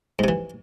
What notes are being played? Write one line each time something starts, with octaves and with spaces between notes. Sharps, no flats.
G#2 C3 E3